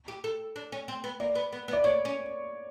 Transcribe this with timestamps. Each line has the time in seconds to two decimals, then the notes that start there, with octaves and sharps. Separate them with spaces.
0.08 G4
0.24 A4
0.56 D4
0.72 C#4
0.88 C4
1.04 B3
1.20 A#3 D5
1.35 B3
1.52 B3
1.68 B3
1.73 D5
1.84 D4 C#5
2.05 C#4